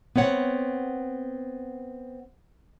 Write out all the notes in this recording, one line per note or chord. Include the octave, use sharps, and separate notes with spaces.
B3 C4 C#5 F#5